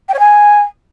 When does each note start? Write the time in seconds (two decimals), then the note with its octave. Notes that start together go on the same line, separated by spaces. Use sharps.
0.09 G5
0.14 C#5
0.19 G#5